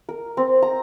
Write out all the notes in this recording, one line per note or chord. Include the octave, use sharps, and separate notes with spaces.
A#4
C4
A#5